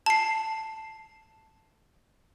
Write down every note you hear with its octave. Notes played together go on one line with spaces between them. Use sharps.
A5 C7